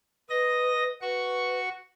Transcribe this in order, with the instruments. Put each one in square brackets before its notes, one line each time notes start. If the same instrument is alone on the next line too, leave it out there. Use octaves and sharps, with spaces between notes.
[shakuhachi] B4 [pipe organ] D#5 A#6
[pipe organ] F#4 C#6 [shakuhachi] B4